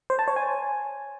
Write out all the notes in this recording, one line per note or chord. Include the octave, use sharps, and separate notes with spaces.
C5
A5
C#5
G#5